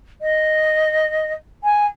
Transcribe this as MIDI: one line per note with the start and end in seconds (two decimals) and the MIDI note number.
0.21 1.32 75
1.63 1.86 80